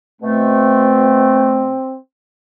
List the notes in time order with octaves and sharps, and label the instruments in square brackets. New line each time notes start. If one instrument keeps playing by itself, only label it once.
[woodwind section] B2 A3 [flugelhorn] C4